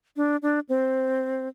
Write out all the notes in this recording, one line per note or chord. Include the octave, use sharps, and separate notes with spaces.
D4
D4
C4